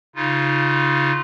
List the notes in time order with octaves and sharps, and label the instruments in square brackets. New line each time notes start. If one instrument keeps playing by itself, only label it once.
[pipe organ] C#3 D#4 F4